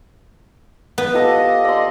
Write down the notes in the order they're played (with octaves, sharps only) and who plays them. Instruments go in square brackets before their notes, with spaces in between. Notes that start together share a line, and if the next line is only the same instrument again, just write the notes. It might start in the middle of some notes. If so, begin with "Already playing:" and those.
[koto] B3
[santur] F4 G4 A4 [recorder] D#5
[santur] D5 C6